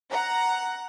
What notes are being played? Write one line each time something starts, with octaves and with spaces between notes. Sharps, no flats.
F#5 A#5